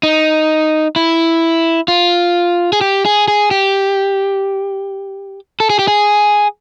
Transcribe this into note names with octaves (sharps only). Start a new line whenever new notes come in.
D#4
E4
F4
G#4
G4
G#4
G#4
G4
A4
G#4
G4
G#4